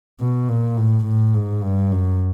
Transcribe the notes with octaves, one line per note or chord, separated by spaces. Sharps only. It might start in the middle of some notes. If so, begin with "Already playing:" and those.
B2
A#2
A2
A2
G#2
G2
F#2